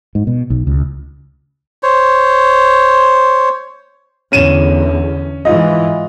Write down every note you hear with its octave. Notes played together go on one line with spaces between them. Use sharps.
G#2
B2
B1
C#2
C5 C#5
E2 D3 C#4 D#7 E7
G#2 E3 F4 D#5